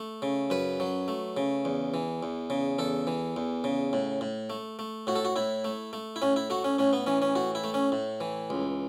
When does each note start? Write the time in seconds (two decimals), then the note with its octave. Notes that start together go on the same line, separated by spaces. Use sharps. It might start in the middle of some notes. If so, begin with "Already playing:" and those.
Already playing: A3
0.22 C#3
0.50 F#2 B4
0.80 F#3
1.08 A3
1.37 C#3
1.65 E2
1.94 E3
2.23 E2
2.50 C#3
2.78 E2 A4
3.07 E3
3.36 E2
3.64 C#3
3.93 A2
4.21 A2
4.50 A3
4.79 A3
5.07 A2 F#4
5.16 A4
5.25 F#4
5.36 A2 E4
5.64 A3
5.93 A3
6.16 E4
6.22 A2 C#4
6.36 E4
6.50 A3 F#4
6.64 C#4
6.78 A2 C#4
6.93 B3
7.06 E3 C#4
7.22 C#4
7.35 A2 F#4
7.55 E4
7.64 A3
7.74 C#4
7.92 A2
8.21 E3
8.50 C#2